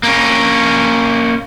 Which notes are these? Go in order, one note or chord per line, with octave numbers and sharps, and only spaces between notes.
A#3 C#4